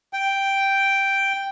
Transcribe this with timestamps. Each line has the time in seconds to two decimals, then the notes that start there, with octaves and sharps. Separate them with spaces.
0.13 G5